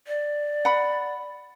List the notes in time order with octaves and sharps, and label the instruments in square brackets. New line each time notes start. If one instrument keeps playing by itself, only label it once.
[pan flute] D5
[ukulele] F#5 B5